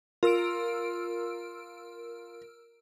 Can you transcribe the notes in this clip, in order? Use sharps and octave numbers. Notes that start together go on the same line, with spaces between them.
F4 A#4 E6 D7